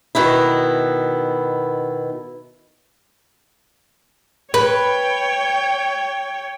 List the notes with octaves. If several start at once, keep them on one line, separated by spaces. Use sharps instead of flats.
B2 D#3 B3 E4
B4 C#5 G5